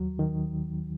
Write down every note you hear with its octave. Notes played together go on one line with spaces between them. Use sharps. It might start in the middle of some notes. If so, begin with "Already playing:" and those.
Already playing: D#2 F#3
D#3